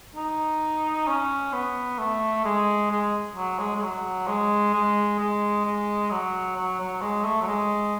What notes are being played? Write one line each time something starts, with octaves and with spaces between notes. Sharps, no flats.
D#4
C#4
B3
A3
G#3
G#3
F#3
G#3
G#3
F#3
G#3
G#3
G#3
G#3
F#3
F#3
F#3
G#3
A3
F#3
G#3